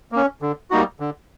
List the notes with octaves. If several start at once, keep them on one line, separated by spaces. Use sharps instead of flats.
A#3 C#4
D3
G3 A#3 D#4 F#4
D3